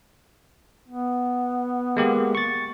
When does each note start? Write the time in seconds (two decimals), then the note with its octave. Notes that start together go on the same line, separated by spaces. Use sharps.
0.88 B3
1.97 G#3 A#3 G4
2.35 C#6 A6